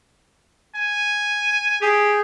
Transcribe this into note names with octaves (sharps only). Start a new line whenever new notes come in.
G#5
G4 G#4